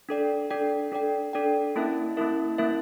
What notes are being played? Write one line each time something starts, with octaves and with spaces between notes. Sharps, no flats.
D4 A4 D5 G5
D4 A4 D5 G5
D4 A4 D5 G5
D4 A4 D5 G5
A#3 C#4 E4 A#4 E5
A#3 C#4 E4 A#4 E5
A#3 C#4 E4 A#4 E5